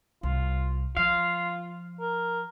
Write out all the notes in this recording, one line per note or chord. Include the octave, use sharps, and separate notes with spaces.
C2 F4
F3 F4 F5
A#4